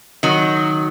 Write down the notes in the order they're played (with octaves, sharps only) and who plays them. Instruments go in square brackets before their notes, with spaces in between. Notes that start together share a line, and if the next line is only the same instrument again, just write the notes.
[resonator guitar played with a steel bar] D#3 F#3